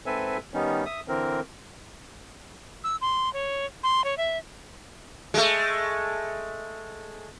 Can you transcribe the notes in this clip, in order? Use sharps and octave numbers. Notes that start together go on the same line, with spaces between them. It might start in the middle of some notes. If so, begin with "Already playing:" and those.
G#2 C4 A4 B4 E5 G#5
D#3 G3 B3 C#4 D#4
E5 D#6
D3 E3 C4 A#4
E6
C6
C#5
C6
C#5
E5
G#3 A3